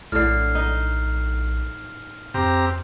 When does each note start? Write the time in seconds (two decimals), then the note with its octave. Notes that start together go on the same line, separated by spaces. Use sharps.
0.12 A#1 A2 D3 F6 C7
0.55 D#4
2.34 F2 C4 G4 A#5